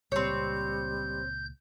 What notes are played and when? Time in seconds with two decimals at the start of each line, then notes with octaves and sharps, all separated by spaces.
0.12 C#2 A#2 G3 C4 C#5 G6